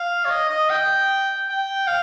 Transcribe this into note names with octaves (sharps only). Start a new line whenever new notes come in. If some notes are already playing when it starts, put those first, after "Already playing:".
Already playing: F5
C#5
D#5
D#5
G5
G5
F5